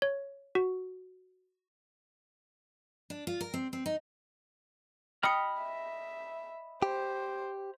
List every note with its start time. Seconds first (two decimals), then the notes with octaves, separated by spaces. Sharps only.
0.02 C#5
0.55 F#4
3.10 D4
3.27 F4
3.41 A#4
3.54 C4
3.73 C4
3.86 D#4
5.23 D#5 G5 B5 D#6 F6 C#7
5.60 E5
6.82 G4 C5